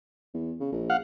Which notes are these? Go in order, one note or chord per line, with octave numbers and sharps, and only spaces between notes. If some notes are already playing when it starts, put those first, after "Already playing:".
E2
C#3
A#1
F5 F#5